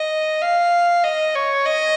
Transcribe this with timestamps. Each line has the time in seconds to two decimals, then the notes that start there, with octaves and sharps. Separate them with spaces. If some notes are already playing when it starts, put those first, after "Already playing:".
Already playing: D#5
0.42 F5
1.04 D#5
1.35 C#5
1.66 D#5